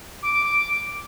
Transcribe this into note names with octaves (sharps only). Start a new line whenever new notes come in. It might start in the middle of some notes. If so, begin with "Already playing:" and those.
D6